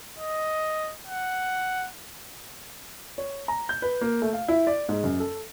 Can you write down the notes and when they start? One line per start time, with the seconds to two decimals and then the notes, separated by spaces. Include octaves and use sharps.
0.19 D#5
1.07 F#5
3.18 C#5
3.48 A#5
3.69 G6
3.82 B4
4.01 A#3
4.22 A3
4.33 F5
4.48 E4
4.67 D5
4.89 G#2
5.04 F#2
5.20 A4